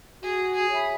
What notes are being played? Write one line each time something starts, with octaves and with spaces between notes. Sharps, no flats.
F#4 G#4
G#4
C#5 E5 B5